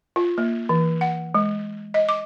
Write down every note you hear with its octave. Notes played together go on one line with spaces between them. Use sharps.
F4
A#3
E3
F#5
G#3
D#5
D6